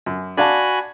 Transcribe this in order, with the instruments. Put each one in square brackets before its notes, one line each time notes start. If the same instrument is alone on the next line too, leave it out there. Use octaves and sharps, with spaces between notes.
[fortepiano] F#2
[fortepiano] D4 F5 A5 [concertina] F#4 G#5 B5